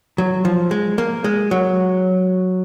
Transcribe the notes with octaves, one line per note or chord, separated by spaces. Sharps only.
F#3
F3
G#3
A#3
G#3
F#3